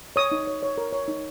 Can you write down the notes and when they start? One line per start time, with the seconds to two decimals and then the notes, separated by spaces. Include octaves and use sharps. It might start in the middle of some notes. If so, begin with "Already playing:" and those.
0.16 C#5 D#6
0.32 D#4
0.47 C#5
0.63 C#5
0.78 A#4
0.92 C#5
1.08 D#4